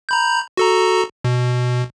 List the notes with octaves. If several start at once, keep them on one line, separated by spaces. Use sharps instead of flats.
A#5 B5 G6
F#4 A4 A#5
B2